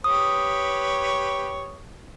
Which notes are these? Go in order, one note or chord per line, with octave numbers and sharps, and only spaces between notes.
G4 B4 C#5 D#6